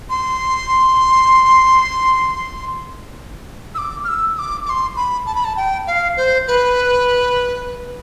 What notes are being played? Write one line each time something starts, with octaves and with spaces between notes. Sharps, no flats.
C6
E6
D6
F6
E6
E6
D6
D6
C6
B5
A5
B5
A5
G5
F5
C5
B4